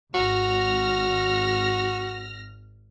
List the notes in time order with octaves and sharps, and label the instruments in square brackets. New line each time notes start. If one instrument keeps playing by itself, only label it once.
[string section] G#1 F6 A#6 [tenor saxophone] F#4